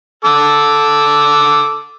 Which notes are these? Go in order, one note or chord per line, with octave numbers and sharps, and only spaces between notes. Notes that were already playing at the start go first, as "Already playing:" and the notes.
A4 D6 E6